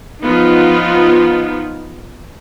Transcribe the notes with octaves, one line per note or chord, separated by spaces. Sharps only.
F3 B3 D#4 F4